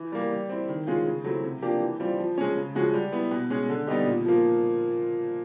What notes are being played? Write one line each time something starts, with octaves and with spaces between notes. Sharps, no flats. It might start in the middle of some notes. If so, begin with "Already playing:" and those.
Already playing: E3
G3 A#3
G3
C4 E4
D#3
G#3 C#4 F4
C#3
F#3 A3 C4 E4
C3
F3 A#3 D4 G4
E3
G3 C4 F4
F3
G#3 C#4
C#3
F3 G#3 C#4 F#4
G3
B3 E4
B2
G#3 C#4
D3
G3 B3 D#4 G4
A#2
F3 A#3